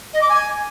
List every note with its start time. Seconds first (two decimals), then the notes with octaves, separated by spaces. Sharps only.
0.13 D#5
0.21 D6
0.29 G#5